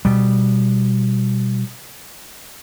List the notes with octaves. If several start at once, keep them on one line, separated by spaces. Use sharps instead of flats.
B2 G3